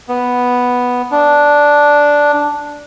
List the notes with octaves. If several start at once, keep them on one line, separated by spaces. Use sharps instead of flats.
B3
D4